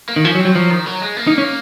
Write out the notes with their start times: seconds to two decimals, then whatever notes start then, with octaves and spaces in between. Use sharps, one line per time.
0.09 A#3
0.16 D#3
0.24 F3 C#4
0.35 F#3
0.40 C4
0.45 F#3
0.55 F3 F#3
0.71 D#3
0.86 F#3
1.01 G#3
1.17 A#3
1.27 D#4
1.38 C#4